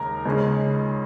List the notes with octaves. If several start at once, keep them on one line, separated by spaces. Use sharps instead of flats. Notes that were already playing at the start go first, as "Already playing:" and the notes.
Already playing: D#2 C#3 G#3 A#4 A#5
C#2 C#3 G#3 C#4